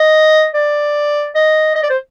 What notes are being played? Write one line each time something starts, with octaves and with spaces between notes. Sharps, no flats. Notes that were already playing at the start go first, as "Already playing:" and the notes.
Already playing: D#5
D5
D#5
D#5
D5
C5